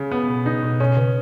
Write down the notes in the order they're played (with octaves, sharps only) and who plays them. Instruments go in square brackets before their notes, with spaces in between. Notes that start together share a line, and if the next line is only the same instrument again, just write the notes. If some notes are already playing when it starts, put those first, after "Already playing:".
Already playing: [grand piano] C#3
B3
[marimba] B2
[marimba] C#3 [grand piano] D#4
[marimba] B2
[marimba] B2 [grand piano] C#4
[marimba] C#3